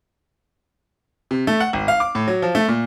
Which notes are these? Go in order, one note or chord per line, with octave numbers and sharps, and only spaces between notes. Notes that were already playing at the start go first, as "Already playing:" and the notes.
C3
A3
F#5
G#1
F5
D6
A2
F#3
F3
A3
A#2